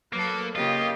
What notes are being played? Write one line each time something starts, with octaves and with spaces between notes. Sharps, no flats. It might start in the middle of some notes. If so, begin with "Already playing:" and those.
F#3 A#3 A4 B4
C#3 A#3 F4 G4 D#5